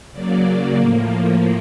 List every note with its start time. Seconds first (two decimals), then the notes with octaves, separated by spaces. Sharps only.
0.12 C#3 F#3 A#3 D5
0.77 A2 F3 A#3